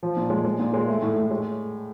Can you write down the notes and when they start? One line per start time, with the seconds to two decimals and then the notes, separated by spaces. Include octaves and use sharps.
0.03 F3
0.17 A#2
0.30 G#3
0.45 G#3
0.59 A#2
0.74 G#3
0.88 A3
1.02 A2
1.17 A2
1.31 G#3